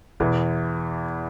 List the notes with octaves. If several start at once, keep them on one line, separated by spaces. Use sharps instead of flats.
E2 B2 E3